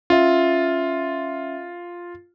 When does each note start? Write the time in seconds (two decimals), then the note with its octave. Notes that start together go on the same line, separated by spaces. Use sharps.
0.10 C#4 F4 E5